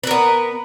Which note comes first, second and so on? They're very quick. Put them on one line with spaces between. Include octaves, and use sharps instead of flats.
B4 A#4 B3